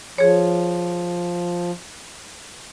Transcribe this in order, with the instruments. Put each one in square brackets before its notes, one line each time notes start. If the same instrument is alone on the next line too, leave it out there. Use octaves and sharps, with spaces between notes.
[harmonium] F3 [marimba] G#4 C#5